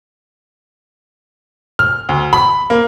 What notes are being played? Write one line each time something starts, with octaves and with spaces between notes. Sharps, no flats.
F6
D2
B5
A#3